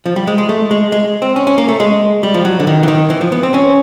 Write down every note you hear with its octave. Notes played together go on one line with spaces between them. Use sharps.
F3
G3
G#3
G#3
A3
G#3
G#3
C4
C#4
C#4
A#3
A3
G#3
G3
F3
F#3
D3
D#3
E3
D#3
E3
F3
B3
C4
C#4